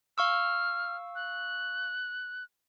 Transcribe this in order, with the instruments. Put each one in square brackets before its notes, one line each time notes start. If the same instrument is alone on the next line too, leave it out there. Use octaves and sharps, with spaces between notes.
[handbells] F5 C#6 E6 [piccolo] F6
[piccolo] F#6